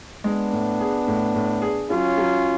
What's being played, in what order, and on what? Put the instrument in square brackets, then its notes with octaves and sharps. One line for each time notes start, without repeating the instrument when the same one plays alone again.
[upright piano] G#3 [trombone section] B3 D4
[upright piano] A2
G#4
A2
A2
G#4
[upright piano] F#3 [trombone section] C#4 F4
[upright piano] F#3